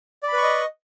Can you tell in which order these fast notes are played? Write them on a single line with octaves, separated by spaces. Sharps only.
D5 B5 B4 C#6 D#5